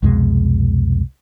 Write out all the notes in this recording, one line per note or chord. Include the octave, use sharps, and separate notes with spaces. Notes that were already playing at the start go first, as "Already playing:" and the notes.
C2 F2 B2 G#3